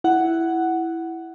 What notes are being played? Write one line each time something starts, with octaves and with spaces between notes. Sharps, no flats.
E4 F#5